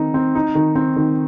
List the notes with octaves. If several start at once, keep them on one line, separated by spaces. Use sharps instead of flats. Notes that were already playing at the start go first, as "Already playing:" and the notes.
Already playing: D#3 C4 D#4
C4
D#4
D#3
C4
D#3